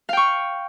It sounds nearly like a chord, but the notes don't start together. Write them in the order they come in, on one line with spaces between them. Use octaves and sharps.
F5 G5 C#6